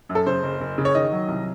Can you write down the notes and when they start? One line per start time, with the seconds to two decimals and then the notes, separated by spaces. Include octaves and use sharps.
0.09 F#2
0.15 A4
0.26 C#3 C5
0.43 F#1
0.61 F#1
0.78 C#3
0.85 C#5
0.95 D#3 D#5
1.12 F#3
1.28 C2